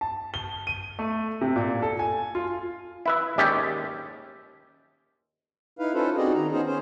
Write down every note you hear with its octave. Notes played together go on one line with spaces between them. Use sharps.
A5
G7
D#7
A3
C3
A#2
A4
G#5
F4
E4 B4 E5
D#2 G#3 C#4 G4 D5 E5
D#4 E4 B4 F5
C#4 D#4 F4 A4 B4 C5
C4 D#4 F#4 G#4 D5 D#5
D#3 A#5
B3 C#4 D#4 G#4 C5
C#4 C5